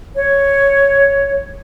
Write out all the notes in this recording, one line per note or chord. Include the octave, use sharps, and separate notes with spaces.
C#5